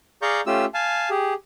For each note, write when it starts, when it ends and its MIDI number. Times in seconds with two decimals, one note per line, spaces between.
0.22 0.41 68
0.22 0.41 74
0.22 0.41 77
0.22 0.41 82
0.22 0.41 85
0.22 0.41 91
0.46 0.65 57
0.46 0.65 61
0.46 0.65 65
0.46 0.65 67
0.46 0.65 88
0.74 1.09 77
0.74 1.09 80
0.74 1.09 81
1.10 1.34 67
1.10 1.34 68